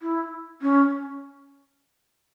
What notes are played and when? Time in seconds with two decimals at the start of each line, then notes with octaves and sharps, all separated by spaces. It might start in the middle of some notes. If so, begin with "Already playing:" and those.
0.02 E4
0.62 C#4